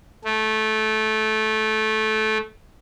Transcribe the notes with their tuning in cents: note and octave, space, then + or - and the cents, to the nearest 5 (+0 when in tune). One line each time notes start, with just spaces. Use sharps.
A3 -15